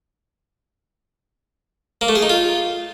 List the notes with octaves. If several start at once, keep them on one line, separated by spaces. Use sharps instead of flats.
A#3
A3
G#4
D#4
F4